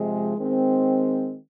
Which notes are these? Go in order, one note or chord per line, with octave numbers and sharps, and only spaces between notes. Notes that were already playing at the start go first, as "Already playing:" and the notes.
Already playing: C3 F3 G#3
D#3 G#3 C4